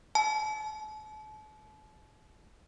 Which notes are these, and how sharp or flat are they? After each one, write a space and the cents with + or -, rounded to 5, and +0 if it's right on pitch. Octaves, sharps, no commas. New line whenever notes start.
A5 -40